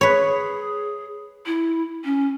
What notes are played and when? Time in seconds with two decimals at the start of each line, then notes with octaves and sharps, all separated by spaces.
0.01 G#4 B4 C#5
1.46 E4
2.05 C#4